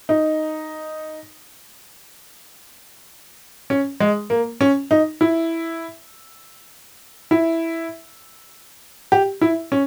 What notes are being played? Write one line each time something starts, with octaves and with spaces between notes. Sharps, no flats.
D#4
C#4
G#3
A#3
C#4
D#4
E4
E4
G4
E4
C#4